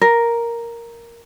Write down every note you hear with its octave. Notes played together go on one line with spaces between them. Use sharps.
A#4